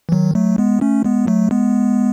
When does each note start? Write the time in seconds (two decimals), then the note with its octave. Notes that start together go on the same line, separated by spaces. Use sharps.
0.09 E3
0.12 D#3 F#3
0.35 F#3 A3
0.58 G#3 B3
0.81 A3 C#4
1.04 G#3 B3
1.27 F#3 A3
1.51 G#3 B3